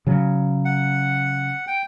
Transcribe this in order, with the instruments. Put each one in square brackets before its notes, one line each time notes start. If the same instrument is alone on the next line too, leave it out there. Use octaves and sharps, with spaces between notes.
[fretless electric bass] C#3 F#3
[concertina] F#5
G5